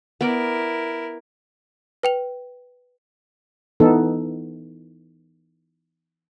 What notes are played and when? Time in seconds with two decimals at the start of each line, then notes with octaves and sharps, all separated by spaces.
0.21 B3 E4 A#4 D5
2.03 B4 G5 F7
3.80 E3 B3 D#4 A4